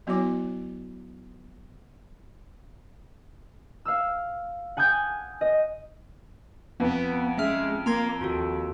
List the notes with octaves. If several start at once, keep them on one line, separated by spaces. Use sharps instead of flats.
F#3 B3 E4 F#4 C#5 D6
F5 E6
F#5 G#5 D#6 G6 G#6
D#5
F2 B3
G#3 C#4 E5 F6
A#3 A#5 C6 G#6
D#2 F4 F#4 A4